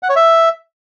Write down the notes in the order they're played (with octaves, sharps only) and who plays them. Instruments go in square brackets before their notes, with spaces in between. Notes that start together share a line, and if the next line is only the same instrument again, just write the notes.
[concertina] F#5
C#5
E5